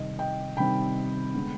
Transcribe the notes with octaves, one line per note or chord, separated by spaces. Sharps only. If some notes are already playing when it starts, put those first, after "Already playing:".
Already playing: C3 D#3 G3 C4 D#5
D#5 G5
C3 D#3 G3 C4 G5 B5
D3 G#3 B3